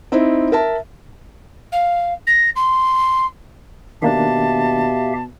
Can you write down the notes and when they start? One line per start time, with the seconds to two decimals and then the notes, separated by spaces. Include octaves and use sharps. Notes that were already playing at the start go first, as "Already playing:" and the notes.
0.12 C4 D#4 E4
0.52 A#4 E5 A5
1.72 F5
2.27 A#6
2.56 C6
4.02 B2 D#3 A#3 D4 G4 E5 F5 A5